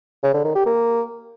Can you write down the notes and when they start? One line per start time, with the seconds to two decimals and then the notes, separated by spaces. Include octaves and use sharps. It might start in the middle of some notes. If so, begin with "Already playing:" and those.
0.23 C#3
0.34 D3
0.44 D#3
0.55 G4
0.66 A#3